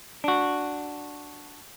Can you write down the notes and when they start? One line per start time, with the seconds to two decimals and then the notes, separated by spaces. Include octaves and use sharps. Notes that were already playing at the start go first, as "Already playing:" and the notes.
0.24 D4 F#4